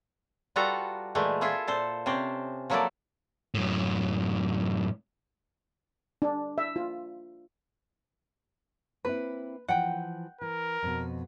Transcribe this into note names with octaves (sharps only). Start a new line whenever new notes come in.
G3 F4 F#4 A4 B4 A#5
A#2 E3 G#3 A3
E4 F4 G#4 A4 E5
A#2 A4 C5
C3 C#4 C5 D5
F3 F#3 A#3 E4 A4 D5
F#2 A2
D4
E5
F4
A#3 C4 E4 B4
E3 F3 F#5 G5
E3 A#4
F2 B2